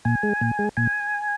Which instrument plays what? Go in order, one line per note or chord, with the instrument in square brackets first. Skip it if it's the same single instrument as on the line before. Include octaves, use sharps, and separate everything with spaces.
[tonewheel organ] A#2 G#5
G#3
A#2
G#3
A#2 G#5